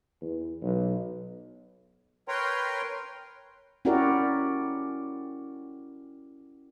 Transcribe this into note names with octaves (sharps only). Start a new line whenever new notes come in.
E2
B1
A#4 B4 C#5 G5 A#5 C6
C#4 E4 F#4 G4 A#4 D5